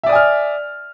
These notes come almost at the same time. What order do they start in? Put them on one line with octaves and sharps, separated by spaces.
E5 D5 D#6 G#5 F6